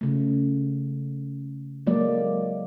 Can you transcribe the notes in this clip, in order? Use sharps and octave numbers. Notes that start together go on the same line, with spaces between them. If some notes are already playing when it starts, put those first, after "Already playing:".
C#3 A3
F#3 G#3 A#3 D5